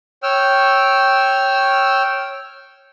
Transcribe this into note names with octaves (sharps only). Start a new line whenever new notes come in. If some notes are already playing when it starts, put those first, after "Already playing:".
C#5 G5 E6 F6